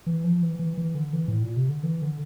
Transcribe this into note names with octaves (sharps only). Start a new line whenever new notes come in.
E3
F3
E3
E3
E3
D3
E3
A2
A#2
C3
D3
E3
D3